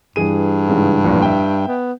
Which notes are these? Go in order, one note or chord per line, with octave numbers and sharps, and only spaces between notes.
G2 E3 G#4 D#7
G#2 C#3 E3
A1 F2 A#2
E5 G5
B3